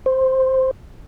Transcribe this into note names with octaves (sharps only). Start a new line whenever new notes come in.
C5